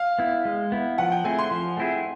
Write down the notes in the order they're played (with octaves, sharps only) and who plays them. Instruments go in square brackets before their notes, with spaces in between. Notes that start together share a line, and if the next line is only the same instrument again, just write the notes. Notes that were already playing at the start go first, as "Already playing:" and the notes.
Already playing: [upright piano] F5
[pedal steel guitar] B3 E4
G#3
B3 E4
[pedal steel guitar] F3 [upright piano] F#5
[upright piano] G5
[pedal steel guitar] A3 C4 E4 G#4 [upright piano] G#5
[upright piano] C6
[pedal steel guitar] F3
A3 C4 E4 G#4